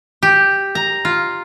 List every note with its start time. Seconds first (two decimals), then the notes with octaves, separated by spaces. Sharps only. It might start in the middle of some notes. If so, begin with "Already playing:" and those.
0.23 G4
0.75 A#5
1.05 F4